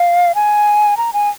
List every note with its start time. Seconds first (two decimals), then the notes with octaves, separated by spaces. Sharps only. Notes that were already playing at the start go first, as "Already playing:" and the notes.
Already playing: F5
0.35 G#5
0.97 A#5
1.13 G#5